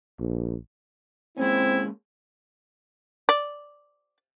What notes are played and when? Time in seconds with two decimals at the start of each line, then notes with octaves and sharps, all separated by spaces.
0.20 A#1
1.38 G#3 A#3 C4 C#4 E4
3.29 D5